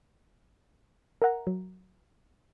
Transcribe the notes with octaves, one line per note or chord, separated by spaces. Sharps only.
A#4 E5 F#5 A#5
F#3